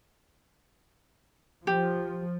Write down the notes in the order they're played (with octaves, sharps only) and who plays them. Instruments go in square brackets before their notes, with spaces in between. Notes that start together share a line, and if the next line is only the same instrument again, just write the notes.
[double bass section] F3 [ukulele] G4